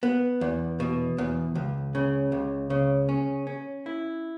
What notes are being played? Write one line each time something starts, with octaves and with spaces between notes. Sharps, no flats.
B3
E2
B2
E2
C#2
C#3
C#2
C#3
C#4
C#4
E4